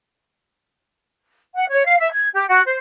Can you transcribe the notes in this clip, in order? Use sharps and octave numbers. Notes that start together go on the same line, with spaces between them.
F#5
C#5
F5
E5
G#6
G4
F#4
C5